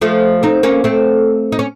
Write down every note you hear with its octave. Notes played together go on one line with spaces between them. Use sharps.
F3 A3
C4 D#4
A#3 C#4
A3 C4
D#4
C#4